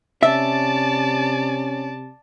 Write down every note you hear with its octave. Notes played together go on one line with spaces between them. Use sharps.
C3 C#4 D5 E5 A5